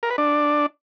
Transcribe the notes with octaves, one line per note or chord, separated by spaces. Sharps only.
A#4
B4
D4